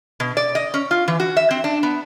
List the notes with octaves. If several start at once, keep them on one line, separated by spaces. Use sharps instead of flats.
B2
D5
D#5
C#4
F4
E3
F#4
E5
C4
D4
B3